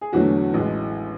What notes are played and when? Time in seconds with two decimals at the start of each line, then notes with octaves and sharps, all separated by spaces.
0.01 G#4
0.13 E2 D3 F#3 A3 F#4
0.54 A1 A2 G#3